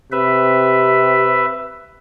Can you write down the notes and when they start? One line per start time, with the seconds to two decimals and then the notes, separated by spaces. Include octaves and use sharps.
0.12 C3 B4 E5